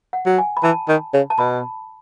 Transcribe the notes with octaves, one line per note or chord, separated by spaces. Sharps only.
F#5
F#3
G#5
B5
E3 A5
D#3
C#3
A5
B2 B5